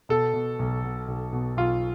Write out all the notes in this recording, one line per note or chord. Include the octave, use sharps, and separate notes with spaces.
B2 A4
B2
B1
B2
B1
B2
B1 F4